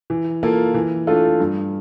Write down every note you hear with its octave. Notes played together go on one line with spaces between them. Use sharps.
E3
A#3 F4 A4
E3
A3 D4 F4 A4
G2